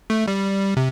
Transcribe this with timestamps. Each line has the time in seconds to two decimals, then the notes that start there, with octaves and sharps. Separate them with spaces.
0.10 A3
0.28 G3
0.77 C3